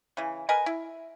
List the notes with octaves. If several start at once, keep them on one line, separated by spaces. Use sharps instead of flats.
C#3 E3
A#4 B4 D#5 G#5
E4